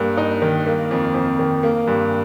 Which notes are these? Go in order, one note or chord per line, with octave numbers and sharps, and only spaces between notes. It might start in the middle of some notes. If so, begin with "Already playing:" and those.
Already playing: G2 A#3
D#4
D#3
A#3
F2
F2
D#3
A#3
G2